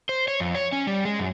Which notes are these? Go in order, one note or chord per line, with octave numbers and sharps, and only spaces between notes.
C5
C#5
F2
C#5
C#4
G3
G#3
F#2